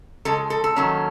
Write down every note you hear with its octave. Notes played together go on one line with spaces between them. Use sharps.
C#3 F3 G#3 A4
A4
A4
D#3 F#3 A#3 C#4